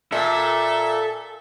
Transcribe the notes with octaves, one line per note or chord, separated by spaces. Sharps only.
A#2 A4 E5